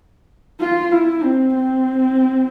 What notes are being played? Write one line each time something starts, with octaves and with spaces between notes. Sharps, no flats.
F4
E4
C4
C4